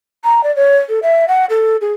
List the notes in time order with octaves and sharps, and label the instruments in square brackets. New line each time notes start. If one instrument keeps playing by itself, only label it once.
[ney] A#5
D5
C#5
A4
E5
F#5
A4
G#4